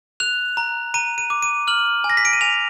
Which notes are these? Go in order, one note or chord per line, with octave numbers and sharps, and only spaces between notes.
F#6 F7
A#5
A#5 D#7
D#7
D6
D#7
F6 F#7
G#5
A#6
B6
D7
D#7
G#5 F7